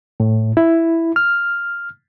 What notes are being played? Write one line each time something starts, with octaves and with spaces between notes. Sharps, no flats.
A2
E4
F6